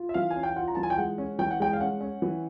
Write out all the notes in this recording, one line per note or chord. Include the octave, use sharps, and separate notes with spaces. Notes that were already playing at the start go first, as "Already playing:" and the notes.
Already playing: F4
E5
E3 F5
G#5
C#4
G5
F4 F#5
A#5
E3 A5
G#5
G5
G#3 F#5
C#4
E3 G5
F#5
G#3 G5
F5
C#4 F#5
C#4
E3